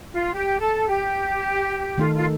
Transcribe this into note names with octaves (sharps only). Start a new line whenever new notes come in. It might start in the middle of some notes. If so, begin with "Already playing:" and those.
F4
G4
A4
G4
D#3 A3 D#4 F4 A4
F4